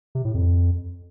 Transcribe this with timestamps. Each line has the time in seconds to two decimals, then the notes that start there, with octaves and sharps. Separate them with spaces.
0.15 C3
0.25 A2
0.34 F2